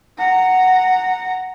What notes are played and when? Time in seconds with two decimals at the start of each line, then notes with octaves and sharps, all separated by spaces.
0.18 F#5 A#5